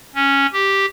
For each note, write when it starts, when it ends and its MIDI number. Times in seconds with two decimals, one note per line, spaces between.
0.15 0.46 61
0.53 0.86 67